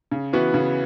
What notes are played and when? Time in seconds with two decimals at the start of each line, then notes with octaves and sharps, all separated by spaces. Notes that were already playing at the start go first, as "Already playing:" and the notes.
0.12 C#3
0.33 E3 B3 F#4
0.54 C#3